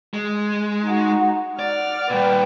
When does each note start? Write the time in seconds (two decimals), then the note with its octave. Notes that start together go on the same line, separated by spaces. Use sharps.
0.14 G#3
0.83 D#4 F#4
1.59 D5 F#5 F6
2.10 A#2 G3 B4 G5